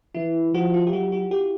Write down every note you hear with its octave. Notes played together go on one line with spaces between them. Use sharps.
E3 E4
F3 F#4
F4
G4
F#3 F#4
F#4
G4